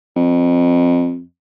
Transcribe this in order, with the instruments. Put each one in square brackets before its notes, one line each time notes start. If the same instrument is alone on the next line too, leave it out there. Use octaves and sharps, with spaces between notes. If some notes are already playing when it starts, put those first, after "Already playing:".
[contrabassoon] F2